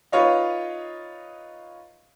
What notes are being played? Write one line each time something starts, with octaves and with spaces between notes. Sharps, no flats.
D#4 F4 B4 C#5 D#5 F5